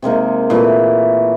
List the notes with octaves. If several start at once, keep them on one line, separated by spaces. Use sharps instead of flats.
C3 G#3 A#3 D#4
A#2 E3 A3